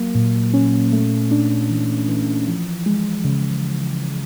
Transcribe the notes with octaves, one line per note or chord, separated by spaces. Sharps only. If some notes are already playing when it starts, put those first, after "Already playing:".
Already playing: F#3 A#3
A#2
C#4
A3
D4
E3
E3
F3
G#3
C#3